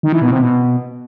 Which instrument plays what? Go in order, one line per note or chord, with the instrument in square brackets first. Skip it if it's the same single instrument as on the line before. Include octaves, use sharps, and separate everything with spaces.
[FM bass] D#3
E3
B2
C3
B2